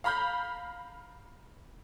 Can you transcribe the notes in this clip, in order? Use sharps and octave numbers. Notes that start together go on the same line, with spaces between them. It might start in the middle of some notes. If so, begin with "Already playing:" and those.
F5 A#5 B5 F6 G6